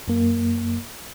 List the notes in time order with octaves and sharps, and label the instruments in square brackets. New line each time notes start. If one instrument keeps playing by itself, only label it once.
[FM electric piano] F#2 A#3